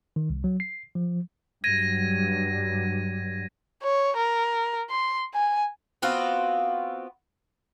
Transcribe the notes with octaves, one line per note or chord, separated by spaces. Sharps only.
D#3
C2
F#3
C7
F3
G2 F#3 G#6 A#6 D#7
C#5
A#4
C6
G#5
B3 C4 F4 F#4